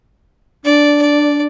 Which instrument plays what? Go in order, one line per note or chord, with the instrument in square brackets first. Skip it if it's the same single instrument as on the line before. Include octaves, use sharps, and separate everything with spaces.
[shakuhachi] D4 [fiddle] D5
[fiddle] D5